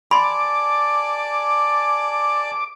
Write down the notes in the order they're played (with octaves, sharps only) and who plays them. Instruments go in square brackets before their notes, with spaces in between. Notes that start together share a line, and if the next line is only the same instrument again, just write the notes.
[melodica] D5 G#5 A5 [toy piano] B5 C6 [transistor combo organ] D6